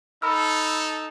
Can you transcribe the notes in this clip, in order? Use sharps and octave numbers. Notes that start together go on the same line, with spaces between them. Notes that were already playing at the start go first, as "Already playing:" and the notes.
D#4 A4 B5 E6 F6